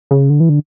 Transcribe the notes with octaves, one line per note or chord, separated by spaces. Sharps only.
C#3
D3
E3
D3